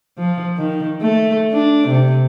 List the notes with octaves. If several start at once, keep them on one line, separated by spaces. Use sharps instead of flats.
F3
D#3
A3
D4
C3